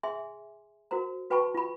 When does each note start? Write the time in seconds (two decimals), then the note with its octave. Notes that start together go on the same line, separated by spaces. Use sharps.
0.03 G#4 E5 G#5 C6
0.91 F#4 A#4 C5 A#5
1.30 F#4 B4 G5 A5 B5 C#6
1.55 F4 B5